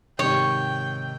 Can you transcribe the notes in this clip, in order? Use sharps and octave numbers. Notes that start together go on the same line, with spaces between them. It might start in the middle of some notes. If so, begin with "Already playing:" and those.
G#2 C3 D#3 C#5 G5